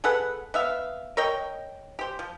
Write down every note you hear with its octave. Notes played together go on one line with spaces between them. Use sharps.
G#4 A4 B4 F#5
B3 E5 F5
A#4 C#5 D#5 G5
G4 C5
F3